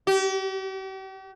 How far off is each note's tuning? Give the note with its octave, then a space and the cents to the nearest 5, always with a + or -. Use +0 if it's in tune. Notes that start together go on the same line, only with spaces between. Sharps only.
G4 -40